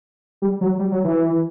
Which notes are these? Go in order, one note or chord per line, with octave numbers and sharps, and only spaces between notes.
G3
F#3
G3
F#3
E3